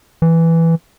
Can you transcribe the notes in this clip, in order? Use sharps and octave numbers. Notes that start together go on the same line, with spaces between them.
E3